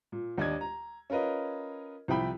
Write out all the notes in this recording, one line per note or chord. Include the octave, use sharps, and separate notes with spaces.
A#2
D#2 D4 D#5 G#6
A#5
C#4 F4 A#4 B4 D#5
C2 F3 E4 G5 B5